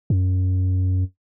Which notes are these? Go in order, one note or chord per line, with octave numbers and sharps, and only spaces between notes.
F#2